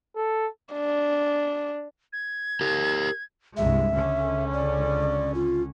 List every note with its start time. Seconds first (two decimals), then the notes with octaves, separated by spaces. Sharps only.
0.16 A4
0.73 D4
2.13 G#6
2.61 G4 A#4
3.57 C2 G2 G#3 E5
3.92 C#2 D3 C#4
4.53 D5
5.34 F4